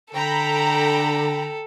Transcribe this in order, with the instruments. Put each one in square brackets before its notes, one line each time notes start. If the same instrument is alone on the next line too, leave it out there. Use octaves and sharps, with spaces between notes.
[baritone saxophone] D3 [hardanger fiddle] A4 [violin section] G5 A#5 B5